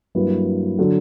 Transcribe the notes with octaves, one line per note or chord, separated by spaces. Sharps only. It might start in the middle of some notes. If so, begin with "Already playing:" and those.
G2 F#3 A#3 E4 B4
D3 F#3